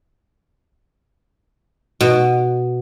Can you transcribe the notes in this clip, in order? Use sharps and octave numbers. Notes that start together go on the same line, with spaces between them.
B2